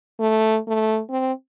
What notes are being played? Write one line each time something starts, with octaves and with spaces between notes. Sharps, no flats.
A3
A3
C4